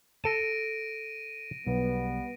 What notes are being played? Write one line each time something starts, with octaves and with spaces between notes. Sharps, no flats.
A4 A5 A#6 D7 D#7
B1 G3 B3